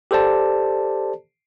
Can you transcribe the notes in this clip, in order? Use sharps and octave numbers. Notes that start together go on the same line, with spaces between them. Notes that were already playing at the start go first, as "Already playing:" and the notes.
G4 A4 C5 D5 A5